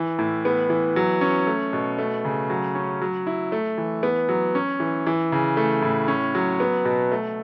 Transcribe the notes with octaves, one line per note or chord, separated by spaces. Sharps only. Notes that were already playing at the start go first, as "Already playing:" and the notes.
Already playing: E3
A2
B3
E3
F#3
C#4
A3
B2
A3
C#3
F#3
C#4
F#3
E4
A3
E3
B3
F#3
C#4
E3
E3
C#3
A3
A2
C#4
F#3
B3
B2
A3